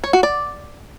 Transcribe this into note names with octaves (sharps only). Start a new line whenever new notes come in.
C#5
F#4
D5